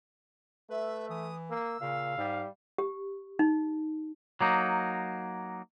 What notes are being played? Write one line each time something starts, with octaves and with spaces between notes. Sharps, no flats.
A3 B4 E5
E3 D#6
A#3 E6
A#2 C#3 F5
G#2 G3
G4
D#4
F#3 A#3 D#4